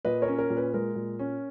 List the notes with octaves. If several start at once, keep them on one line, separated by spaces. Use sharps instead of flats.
A#2 B4 D#5
A#4 C#5
C#4
A#4
A#2
B4
G#3 A#4
A#2
C#4